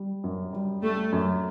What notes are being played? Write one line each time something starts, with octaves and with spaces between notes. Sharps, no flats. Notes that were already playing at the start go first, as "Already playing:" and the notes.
Already playing: G3
F#2
G3
G3 A3
F#2